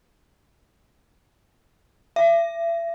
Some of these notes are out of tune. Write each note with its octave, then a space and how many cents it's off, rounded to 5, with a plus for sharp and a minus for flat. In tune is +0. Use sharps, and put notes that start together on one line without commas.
E5 +35